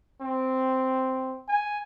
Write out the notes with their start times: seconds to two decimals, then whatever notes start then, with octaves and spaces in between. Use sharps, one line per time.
0.21 C4
1.49 G#5